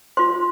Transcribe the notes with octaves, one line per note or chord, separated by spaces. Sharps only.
F4 C5 C6